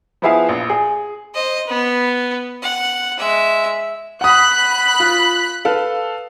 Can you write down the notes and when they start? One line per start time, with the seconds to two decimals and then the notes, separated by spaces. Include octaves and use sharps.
0.22 F3 B3 E4 G#4 E5 F5
0.49 A#1
0.70 G#4
1.35 C5 D#5
1.67 B3
2.63 F#5
3.18 G#3 E5
4.21 F#5 B5 D#6 F#6
5.00 F4
5.65 A4 B4 F5